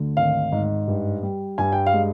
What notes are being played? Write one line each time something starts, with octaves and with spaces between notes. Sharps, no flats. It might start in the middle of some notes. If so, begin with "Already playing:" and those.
Already playing: D2 D3
G#1 F5
G#2
G2
G3
G2 G#5
G5
F5
G#3